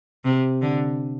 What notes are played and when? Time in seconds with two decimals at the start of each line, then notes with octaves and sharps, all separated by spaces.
0.25 C3
0.62 D3